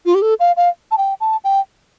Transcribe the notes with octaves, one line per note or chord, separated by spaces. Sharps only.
F4
G4
A4
F5
F5
A5
G5
A5
G5